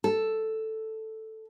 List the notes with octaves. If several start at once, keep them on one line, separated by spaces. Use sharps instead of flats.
A4